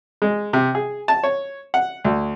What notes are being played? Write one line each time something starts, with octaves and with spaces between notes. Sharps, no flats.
G#3
C3
G#4
A5
C#5
F#5
D2